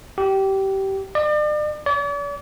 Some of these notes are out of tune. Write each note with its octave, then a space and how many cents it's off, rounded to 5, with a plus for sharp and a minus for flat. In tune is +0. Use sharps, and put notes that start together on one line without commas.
G4 -20
D5 +40
D5 -45